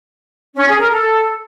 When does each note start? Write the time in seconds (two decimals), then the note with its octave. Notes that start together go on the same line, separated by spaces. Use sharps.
0.55 C#4
0.67 G#4
0.78 A#4
0.90 A4